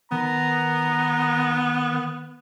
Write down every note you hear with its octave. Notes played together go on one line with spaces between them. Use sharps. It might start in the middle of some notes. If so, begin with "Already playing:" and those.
D#3 B3 A#5